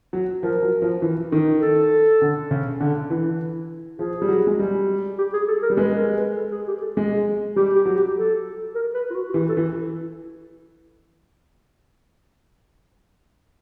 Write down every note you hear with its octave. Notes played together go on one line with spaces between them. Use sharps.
F#3
F3 A#4
F#3
F3
E3
D#3
A4
D3
C#3
D3
E3
F3 G#4
G3
F#3
G#3
G3
G4
G#4
A4
A#4
G3
G#3 B4
A#4
B4
A4
G#4
G4
A4
G#3 G#4
G3 G4
G4
F#3
G4
A4
A#4
B4
F4
F#4
F#4
E3 G4
A4
E3